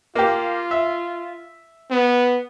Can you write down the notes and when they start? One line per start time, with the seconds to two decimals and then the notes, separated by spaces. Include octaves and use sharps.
0.15 A#3 F4 G4
0.71 E5
1.91 B3